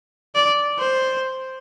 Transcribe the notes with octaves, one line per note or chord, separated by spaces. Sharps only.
D5
C5